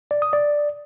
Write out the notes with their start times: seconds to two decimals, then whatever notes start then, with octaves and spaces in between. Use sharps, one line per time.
0.11 D5
0.22 D#6
0.33 D5